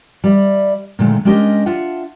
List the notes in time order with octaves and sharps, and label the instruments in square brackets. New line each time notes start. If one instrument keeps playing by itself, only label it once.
[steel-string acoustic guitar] G3 D5 E5
A#2 D3 D#3 G#3 A3
G#3 C#4 D4 G4 A#4 D#5
D4 F4 E5 F#5